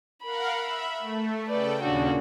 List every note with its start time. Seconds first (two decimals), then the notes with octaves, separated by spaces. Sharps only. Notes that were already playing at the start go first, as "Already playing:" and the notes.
0.23 A#4 F5 F#5 B5
0.61 E5
0.98 A3
1.48 C#3 A4 B4 D5 G5
1.82 D#2 A#2 C#3 D4 F#4